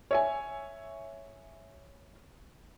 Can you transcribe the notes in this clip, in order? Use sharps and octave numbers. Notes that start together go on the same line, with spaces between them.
C#5 E5 G#5